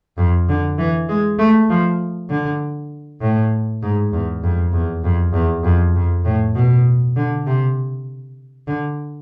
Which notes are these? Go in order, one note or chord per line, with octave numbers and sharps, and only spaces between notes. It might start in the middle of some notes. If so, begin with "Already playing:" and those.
F2
D3
E3
G#3
A3
F3
D3
A2
G#2
E2
F2
E2
F2
E2
F2
F2
A2
B2
D3
C3
D3